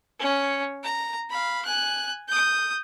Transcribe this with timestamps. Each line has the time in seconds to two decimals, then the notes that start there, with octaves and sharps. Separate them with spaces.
0.19 C#4 C#5
0.83 A#5
1.30 F5 B5
1.66 G#5 F#6
2.28 D#6 G6